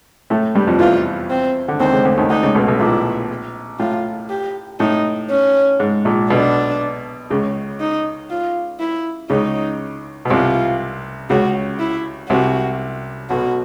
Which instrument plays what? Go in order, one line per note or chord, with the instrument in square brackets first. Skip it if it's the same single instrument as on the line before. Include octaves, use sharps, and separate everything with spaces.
[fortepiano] A2 A3
G2 G3
F2 F3
[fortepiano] E2 E3 [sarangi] F4
[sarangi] C4
[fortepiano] D3
[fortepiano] D#2 D#3 [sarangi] C4
[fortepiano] C#2 C#3
D2 D3
D#2 D#3
[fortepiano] D2 D3 [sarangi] D#4
[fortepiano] C#2 C#3
B1 B2
B1 B2
[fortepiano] A#1 A#2 [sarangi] E4
[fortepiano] A2 [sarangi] F4
[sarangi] G4
[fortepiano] A2 [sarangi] D#4
[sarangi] C#4
[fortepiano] G#2
A#1 A#2
[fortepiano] B1 B2 [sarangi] D4
[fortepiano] C#2 C#3
[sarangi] D#4
F4
E4
[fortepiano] C#2 C#3 [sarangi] D#4
[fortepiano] B2
[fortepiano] C2 C3 [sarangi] F4
[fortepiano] C#2 C#3 [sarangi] F#4
[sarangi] E4
[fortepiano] C2 C3 [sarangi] F#4
[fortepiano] B1 B2 [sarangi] F#4